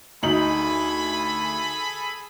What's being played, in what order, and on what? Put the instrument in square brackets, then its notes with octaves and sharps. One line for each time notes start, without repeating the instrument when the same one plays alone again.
[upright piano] D2 F#7 [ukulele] D#4 [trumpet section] G#4 A4 B5